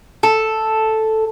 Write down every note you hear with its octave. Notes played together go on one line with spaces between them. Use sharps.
A4